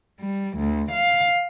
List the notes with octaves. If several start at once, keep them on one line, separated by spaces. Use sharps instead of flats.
G3
D2
F5